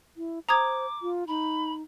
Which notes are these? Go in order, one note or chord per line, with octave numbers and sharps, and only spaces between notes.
E4
C5 A#5 D6 D#6 G#6
F4
D#4 B5